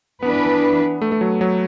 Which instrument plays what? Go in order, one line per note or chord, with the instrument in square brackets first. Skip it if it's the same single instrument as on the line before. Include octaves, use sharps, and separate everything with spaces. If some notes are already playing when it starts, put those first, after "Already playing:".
[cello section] E3 D4 B4 [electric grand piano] B3
[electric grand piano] A3
A3
F#3
F#3